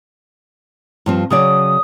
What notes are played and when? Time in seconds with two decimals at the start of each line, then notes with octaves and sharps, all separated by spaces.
1.06 G2 F3 C4
1.30 C#3 F#3 D5 D#6